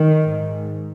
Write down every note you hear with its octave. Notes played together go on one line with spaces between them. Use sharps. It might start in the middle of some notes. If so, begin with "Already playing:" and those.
Already playing: D#3
G#2